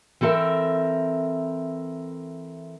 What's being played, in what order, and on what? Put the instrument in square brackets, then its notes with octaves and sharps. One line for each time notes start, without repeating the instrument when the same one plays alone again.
[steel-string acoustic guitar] E3 C4 A4 A#4 E5